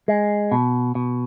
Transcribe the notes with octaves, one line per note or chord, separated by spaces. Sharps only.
G#3
B2
B2